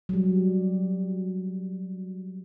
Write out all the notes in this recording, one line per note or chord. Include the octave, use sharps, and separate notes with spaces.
F#3 G3